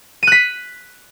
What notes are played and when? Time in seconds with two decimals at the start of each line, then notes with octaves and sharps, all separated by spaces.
0.23 D#7
0.27 F#6
0.32 B6